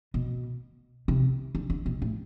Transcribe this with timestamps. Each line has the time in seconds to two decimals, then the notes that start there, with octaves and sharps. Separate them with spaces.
0.14 B2
1.08 C3
1.55 D3
1.70 D3
1.86 B2
2.02 A2